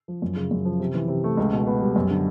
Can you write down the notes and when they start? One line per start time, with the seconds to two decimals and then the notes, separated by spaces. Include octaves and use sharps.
0.08 F3
0.22 F#2
0.36 C#3
0.51 F#2
0.65 F3
0.80 C3
0.95 E3
1.08 C3
1.24 A3
1.37 C#2
1.53 B2
1.67 B3
1.81 G3
1.96 F#2
2.11 D3